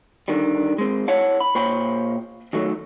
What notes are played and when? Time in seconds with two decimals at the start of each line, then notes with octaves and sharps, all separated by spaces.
0.28 D3 D#3 G3
0.78 G#3 C4
1.08 E4 C#5 F#5 A5
1.40 B5
1.55 A#2 C5 C#5 G5 B5
2.53 D#3 F#3 A3